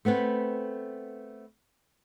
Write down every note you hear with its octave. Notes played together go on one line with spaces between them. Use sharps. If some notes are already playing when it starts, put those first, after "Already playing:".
A3 B3 C4 B4